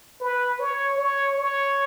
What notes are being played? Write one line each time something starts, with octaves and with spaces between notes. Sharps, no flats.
B4
C#5
C#5
C#5